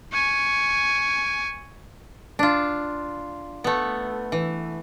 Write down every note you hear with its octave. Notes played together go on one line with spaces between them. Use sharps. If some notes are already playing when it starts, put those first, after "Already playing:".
G#5 C#6
D4 F4
A3 B3
E3